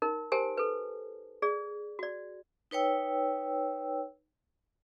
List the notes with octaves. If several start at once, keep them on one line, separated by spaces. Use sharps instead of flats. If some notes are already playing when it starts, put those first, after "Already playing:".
D#4 A#4
G4 A#4 C5 G#5 A5
A4 B4
G#4 D5
F#4 D5
D#4 B4 C#5 G5 E6